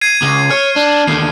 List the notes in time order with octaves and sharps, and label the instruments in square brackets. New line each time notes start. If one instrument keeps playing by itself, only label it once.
[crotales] G#6 C7 D#7
[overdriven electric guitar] C#2
[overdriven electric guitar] C#5 [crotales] F6
[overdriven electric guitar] D4
[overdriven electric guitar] D#2 D3 [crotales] C7